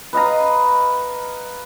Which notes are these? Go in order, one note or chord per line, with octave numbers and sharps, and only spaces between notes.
B4 D#5 F5 A#5